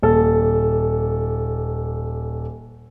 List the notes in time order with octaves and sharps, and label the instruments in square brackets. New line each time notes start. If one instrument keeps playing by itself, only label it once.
[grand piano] D#1 A4